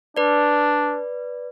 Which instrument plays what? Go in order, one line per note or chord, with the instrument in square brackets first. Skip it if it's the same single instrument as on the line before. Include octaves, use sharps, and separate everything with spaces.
[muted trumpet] D4 [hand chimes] B4 D5